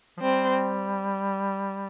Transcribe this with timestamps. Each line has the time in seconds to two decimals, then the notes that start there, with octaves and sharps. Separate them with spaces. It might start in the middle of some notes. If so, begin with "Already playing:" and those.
0.17 F3
0.21 G3 C4